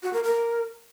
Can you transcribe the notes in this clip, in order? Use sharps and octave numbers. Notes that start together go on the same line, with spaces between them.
F#4
A#4
A#4